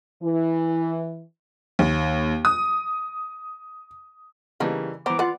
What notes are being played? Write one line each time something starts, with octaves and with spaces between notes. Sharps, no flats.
E3
D#2
D#6
C#3 E3 G3 A#3 D4 D#4
E3 B3 C5 A#5 D6
F4 B4 D5 F#5 D6